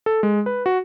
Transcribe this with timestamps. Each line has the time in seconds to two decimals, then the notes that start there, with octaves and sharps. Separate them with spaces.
0.06 A4
0.23 G#3
0.46 B4
0.66 F#4